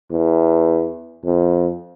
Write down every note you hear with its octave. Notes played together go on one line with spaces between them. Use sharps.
E2
F2